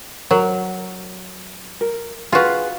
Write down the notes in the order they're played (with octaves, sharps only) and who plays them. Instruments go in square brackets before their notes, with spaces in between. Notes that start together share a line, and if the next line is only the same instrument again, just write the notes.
[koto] F#3 [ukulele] A#4
[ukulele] A#4
[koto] F4 F#4 [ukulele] G#4 B4